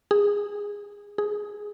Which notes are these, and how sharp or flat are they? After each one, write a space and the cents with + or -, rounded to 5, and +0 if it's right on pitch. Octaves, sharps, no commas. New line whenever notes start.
G#4 -20
G#4 +0